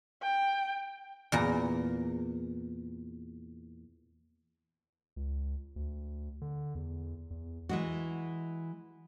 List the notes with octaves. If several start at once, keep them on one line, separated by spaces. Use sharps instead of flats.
G5
E2 A#2 A#5
C#2
D2
D3
E2
E2
E3 G#3 F#4